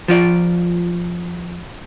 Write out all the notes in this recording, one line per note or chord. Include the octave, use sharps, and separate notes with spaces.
F3 F4 D5